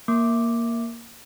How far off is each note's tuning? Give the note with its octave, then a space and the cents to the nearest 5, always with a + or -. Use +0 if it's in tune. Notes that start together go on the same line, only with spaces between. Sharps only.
A#3 +0 D6 +0